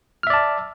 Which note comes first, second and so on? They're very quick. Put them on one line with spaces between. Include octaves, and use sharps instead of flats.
F6 E5 D5 A5